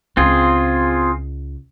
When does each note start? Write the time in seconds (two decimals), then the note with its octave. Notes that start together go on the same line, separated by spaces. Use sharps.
0.17 C#2 C4 F4 G#4